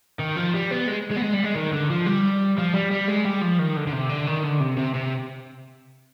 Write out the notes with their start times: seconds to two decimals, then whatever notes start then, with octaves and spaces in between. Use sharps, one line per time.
0.19 D#3
0.36 F3
0.54 G3
0.71 B3
0.87 G#3
1.11 G#3
1.16 B3
1.22 G#3
1.33 G3
1.44 G#3
1.55 D#3
1.73 D3
1.90 F3
2.06 G3
2.58 F3
2.73 G3
2.91 G3
3.08 G#3
3.25 G3
3.41 F3
3.59 D#3
3.76 D3
3.87 D3
3.93 C3
4.09 D3
4.27 D#3
4.44 D3
4.60 C3
4.77 C3
4.94 C3